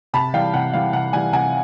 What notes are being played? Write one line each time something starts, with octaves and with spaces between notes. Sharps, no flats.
C3 A5 B5
E3 G3 F5 G5
C3 F#5
E3 G3 F5
C3 F#5
E3 G3 F#5 G#5
C3 F#5 G#5